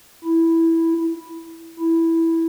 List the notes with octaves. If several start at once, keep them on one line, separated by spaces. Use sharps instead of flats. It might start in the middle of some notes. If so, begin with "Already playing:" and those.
E4
E4